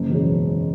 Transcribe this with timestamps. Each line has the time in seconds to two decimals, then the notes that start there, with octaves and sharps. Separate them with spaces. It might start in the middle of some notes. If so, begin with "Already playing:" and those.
Already playing: F#1
0.10 E2 B2 G#3 C#4